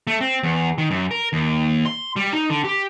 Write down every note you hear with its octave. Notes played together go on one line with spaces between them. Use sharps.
A3
C4
E2
D#3
F#2
A#4
D#2
C6
G3
D#4
D3
G4